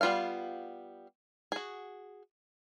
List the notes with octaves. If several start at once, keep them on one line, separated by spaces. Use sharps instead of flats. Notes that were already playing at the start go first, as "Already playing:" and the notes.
G3 B3 F4 A#4 F5
F#4 G#4